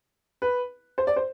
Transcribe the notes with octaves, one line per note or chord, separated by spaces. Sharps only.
B4
C5
D5
C5